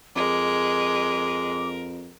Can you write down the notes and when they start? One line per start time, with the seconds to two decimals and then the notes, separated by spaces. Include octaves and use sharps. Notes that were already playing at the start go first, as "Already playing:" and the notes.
0.16 F2 G#3 A#4 D6